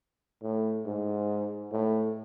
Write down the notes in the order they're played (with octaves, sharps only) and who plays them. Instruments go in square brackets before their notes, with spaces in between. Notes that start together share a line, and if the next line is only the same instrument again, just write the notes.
[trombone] A2
G#2
A2